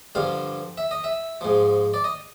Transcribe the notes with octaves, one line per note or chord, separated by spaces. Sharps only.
G2 D3 F3 F5
E5
D#5
E5
G#2 F3
D5
D#5